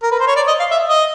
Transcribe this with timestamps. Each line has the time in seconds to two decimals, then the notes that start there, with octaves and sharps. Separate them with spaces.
0.03 A#4
0.12 B4
0.20 C5
0.28 C#5
0.36 D5
0.48 D#5
0.60 F5
0.71 E5
0.89 D#5